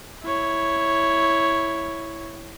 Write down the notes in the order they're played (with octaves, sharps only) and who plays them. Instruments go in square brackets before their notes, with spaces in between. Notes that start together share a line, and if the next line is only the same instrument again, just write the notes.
[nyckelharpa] E4 C#5